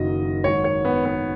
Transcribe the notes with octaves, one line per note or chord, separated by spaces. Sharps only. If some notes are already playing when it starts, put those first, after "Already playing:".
Already playing: F#1 F#2 D#3 F#3 D#5
G#1 G#2 D#3 C#5
C#5
B3
B3